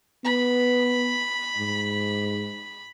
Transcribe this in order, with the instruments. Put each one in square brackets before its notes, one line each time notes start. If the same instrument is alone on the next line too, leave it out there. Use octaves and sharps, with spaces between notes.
[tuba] B3 [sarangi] B5
[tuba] G#2